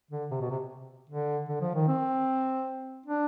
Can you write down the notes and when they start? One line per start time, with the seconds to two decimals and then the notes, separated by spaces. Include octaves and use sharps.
0.11 D3
0.31 C3
0.41 B2
0.50 C3
1.09 D3
1.48 D3
1.61 F3
1.75 D#3
1.88 C4
3.06 D4